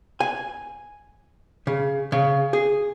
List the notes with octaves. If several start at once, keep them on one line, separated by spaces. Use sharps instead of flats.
G#5
C#3
C#3
G#4